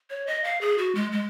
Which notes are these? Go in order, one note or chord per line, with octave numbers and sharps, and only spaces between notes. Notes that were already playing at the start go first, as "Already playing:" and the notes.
C#5
D#5
F5
G#4
F#4
G#3
G#3